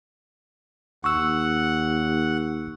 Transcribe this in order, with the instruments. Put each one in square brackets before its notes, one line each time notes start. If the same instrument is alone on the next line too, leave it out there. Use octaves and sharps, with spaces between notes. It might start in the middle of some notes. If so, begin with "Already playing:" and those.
[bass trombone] D#2 [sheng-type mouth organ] F#5 [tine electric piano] C#6 E6